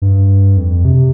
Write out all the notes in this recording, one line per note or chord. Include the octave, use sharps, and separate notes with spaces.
G2
F2
C3